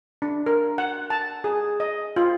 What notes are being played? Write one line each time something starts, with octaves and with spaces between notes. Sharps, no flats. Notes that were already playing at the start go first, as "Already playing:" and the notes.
D4
A#4
F#5
A5
G#4
D#5
F4